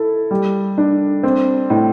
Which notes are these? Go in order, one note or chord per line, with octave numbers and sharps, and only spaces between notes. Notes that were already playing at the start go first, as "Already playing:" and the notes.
Already playing: E4 A4
G3
D4
C4
A2